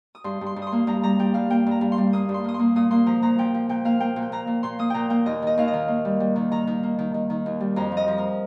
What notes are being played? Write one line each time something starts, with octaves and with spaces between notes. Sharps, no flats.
D#6
G2 C6
G2
C6
G2
D#6
C6
A#3
G2 A#5
G3 A#5
G3 G5
G2 F5
A#3 G5
G2 A#5
G2
C6
G3
A#3 D#6
G2
C6
A#3 D#6
C6
A#3
A#2 D#6
A#3 C6
F3 A#5
A#2 A#5
F3 G5
F3
A#2 G5
A#3 F5
A#3 G5
A#2
G5
A#2 A#5
A#2
A#2 C6
A#3 D#6
A#2 G5 A#5
A#3 G5
D#2 D#5
D#3 D#5
D#2 F5
D#5
D#3
A#3
G3
G3
D#3
D#3 A#5
D#3
A#3
D#3
D#3
D#3
D#2
G3
F2 A#5
F3
D#5
F3
A#4